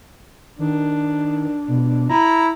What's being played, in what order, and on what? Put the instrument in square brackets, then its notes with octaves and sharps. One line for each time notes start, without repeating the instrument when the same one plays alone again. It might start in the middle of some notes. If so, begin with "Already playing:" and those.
[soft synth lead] D#3 [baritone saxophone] D4
[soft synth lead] B2
[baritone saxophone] E4 [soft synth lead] A#5